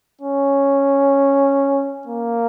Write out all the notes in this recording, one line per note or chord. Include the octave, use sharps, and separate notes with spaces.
C#4
A#3